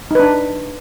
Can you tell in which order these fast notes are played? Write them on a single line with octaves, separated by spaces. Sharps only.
D#4 B4 D4